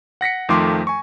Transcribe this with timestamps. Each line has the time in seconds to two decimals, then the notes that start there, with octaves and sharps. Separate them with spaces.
0.21 F#5 A#6 B6 C#7
0.49 F2 D#3 F3 A3 C6 D6
0.87 G#5 C#6